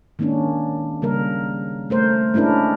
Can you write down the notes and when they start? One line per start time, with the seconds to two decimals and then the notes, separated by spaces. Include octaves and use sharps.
0.19 D#3 G#3 A#3 C#4 D4
1.02 C#3 G3 A#3 A#4
1.90 A3 A#4 C5
2.34 G#3 C#4 D4 E4 A#4